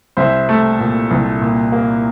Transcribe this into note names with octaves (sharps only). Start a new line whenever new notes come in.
C2 C5 E5
A3
A#2
C2
A#2
A#3